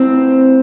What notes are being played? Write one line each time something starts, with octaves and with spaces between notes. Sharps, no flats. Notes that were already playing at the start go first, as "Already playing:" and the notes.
Already playing: A2 E3 C4